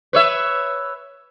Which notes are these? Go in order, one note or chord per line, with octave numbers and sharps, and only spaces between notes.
B4 C#5 E5